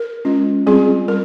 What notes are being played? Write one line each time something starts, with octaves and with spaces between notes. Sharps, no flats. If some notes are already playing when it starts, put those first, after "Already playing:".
Already playing: A#4
G#3 C#4 F4
G3 C4 F4 G#4
G3 A#4